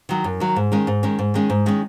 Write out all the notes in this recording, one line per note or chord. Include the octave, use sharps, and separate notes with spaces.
D#3 F#3
F#2
D#3 F#3
G#2
D#3 G#3 C#4
G#2
D#3 G#3 C#4
G#2
D#3 G#3 C#4
G#2
D#3 G#3 C#4